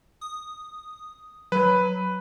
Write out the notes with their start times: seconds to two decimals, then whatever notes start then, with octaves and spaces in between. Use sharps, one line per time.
0.21 D#6
1.52 F#3 B4